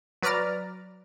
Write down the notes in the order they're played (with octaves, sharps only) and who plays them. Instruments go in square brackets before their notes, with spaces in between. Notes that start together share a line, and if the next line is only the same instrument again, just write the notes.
[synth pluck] F#3 B4 D5 A#5 F6 A6